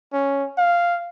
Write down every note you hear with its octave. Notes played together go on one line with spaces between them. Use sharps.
C#4
F5